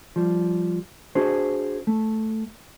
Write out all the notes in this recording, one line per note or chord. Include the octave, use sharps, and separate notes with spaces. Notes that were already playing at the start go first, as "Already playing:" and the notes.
F3 G3
D4 F#4 G#4 C5
A3